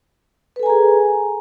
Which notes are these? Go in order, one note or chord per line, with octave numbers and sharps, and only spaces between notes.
G#4 A4 B4 G#5 A#5